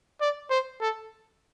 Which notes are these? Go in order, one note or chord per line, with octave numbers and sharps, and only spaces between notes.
D5
C5
A4